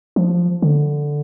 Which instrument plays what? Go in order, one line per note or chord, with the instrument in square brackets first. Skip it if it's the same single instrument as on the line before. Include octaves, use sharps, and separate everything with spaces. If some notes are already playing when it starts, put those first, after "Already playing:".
[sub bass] F3
D3